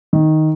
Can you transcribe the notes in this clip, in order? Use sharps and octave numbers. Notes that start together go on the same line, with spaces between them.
D#3